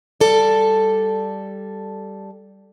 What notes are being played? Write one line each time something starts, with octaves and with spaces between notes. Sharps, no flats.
G3 A4 D5